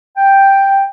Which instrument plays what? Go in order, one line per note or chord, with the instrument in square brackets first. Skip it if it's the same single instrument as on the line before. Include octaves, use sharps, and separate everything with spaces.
[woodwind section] G5